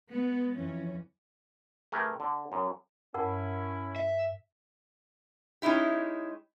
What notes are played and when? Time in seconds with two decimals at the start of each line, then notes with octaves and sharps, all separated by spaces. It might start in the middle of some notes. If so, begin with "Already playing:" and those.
0.11 G#3 B3
0.56 F2 E3 C#4
1.92 A3 G4 G#4 A#4 B4
2.20 D3
2.52 F#2
3.14 G2 C#4 E4 A#4 F#5 A5 B5
3.96 E5
5.62 G#3 C#4 D#4 E4 G4